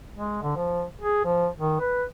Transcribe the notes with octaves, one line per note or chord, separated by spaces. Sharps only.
G#3
D3
F3
G#4
F3
D#3
B4